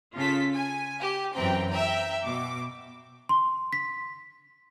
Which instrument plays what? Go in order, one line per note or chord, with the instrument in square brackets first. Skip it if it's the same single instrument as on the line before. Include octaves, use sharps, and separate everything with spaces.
[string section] C#3 F4 A4 B6
G#5
G4
F#2 E3 C4 G5 A#5
E5 G5 A#5
B2 D6
[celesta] C6
B6